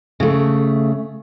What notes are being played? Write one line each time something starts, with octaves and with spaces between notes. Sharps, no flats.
C#3 A3